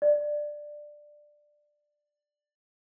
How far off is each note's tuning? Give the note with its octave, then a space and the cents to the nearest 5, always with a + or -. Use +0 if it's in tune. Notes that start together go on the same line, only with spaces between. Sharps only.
D5 +10